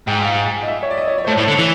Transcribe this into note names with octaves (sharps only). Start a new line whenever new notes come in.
G#2 G5
F5
D#5
E5
C#5
D5
D#5
C#5
C#5
C5
A2
C#5
A2
D3
E3